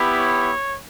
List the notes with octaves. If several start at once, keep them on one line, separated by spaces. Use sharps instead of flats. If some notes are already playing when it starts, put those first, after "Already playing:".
Already playing: B3 E4 G4
C#5